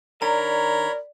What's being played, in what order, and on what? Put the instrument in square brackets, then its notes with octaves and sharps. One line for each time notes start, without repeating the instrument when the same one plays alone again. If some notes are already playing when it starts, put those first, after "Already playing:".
[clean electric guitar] D#3 D4 A#5 [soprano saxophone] A#4 [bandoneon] C#5 B5 [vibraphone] D5